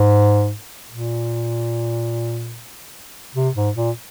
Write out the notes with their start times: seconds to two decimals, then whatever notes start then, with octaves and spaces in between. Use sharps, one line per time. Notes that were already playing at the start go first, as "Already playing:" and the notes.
Already playing: G#2
0.90 A#2
3.35 C3
3.55 G#2
3.76 A#2